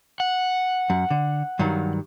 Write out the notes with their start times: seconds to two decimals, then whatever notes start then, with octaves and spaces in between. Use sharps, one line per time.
0.20 F#5
0.90 F#2
1.11 D3
1.59 G2 D#3 F#3